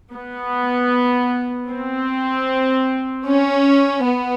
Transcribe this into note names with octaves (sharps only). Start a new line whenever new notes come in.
B3
C4
C#4
B3